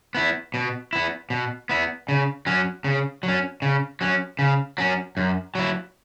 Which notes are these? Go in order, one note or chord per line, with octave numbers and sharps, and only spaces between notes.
B3 E4
B2
B3 E4
B2
B3 E4
C#3
F#3 C#4
C#3
F#3
C#4
C#3
F#3 C#4
C#3
F#3 C#4
F#2
F#3 E4